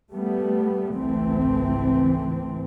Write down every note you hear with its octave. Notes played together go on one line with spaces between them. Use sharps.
G3 A3 B3
G#1 C#2 E3 A3 C4